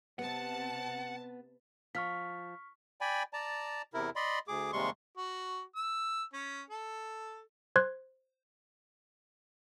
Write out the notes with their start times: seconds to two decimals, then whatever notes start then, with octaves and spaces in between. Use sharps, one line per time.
0.19 C3 B3 F#5 A5
1.95 F3 C#6 F6 B6
3.01 D5 G5 G#5 B5
3.33 D5 A5 A#5
3.94 E2 C3 E4 A#4
4.16 D5 D#5 B5 C6
4.48 D2 G#4 D6
4.73 D#2 C3 G3 G#3 C6 C#6
5.17 F#4
5.76 E6
6.33 C#4
6.70 A4
7.76 C5 C6 F#6 G#6